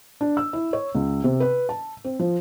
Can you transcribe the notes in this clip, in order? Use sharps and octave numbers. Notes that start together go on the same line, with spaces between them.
D4
E6
E4
C#5
C#2
C3
B4
A5
C4
F3